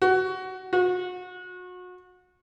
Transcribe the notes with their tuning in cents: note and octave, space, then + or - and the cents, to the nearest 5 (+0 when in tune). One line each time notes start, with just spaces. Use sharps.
F#4 +15
F#4 -35